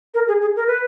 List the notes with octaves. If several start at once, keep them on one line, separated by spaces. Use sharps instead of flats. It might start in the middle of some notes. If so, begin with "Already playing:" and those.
A#4
G#4
G#4
A#4
B4